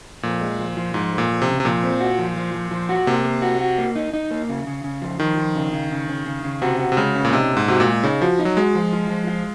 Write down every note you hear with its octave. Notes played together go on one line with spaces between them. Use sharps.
F2 A#2
G#3
F3
F3
G#2 F3
F2
A#2
F2
C3
C#3
C3
A#2 F3
C4
F#4
F3
F3
F3
F3
F#4
C3 A#3
A#3
F#4
F#4
A#3
D#4
D#4
A#3
C#3
C#3
C#3
F3
D#3 F3
F3
C#3
C#3
C#3
C#3
C#3
C#3
C3 F#4
F#4
C3
C#3 G#3
C#4
A#2
C3 D#4
A#2
G#2
C3 F#4
A#2
G#3
C#3 D#4
F3 F#4
D#4
F#3
G#3 F#4
F3
F4
F3
F4